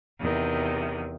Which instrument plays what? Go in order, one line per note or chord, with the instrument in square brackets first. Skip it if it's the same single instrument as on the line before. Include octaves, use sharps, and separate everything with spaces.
[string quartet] E2 C3 D#3